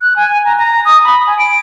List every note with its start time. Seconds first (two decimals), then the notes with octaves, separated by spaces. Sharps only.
0.01 F#6
0.16 G#5
0.45 A#5
0.57 A#5
0.85 D#6
1.04 B5
1.27 G#5
1.39 D7